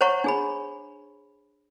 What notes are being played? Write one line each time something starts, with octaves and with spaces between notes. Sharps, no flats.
C5 C#5 F#5 A#5 C#6
D4 G#4 B5